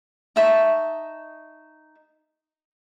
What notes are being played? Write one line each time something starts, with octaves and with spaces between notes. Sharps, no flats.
D#4 E5 A5 C#6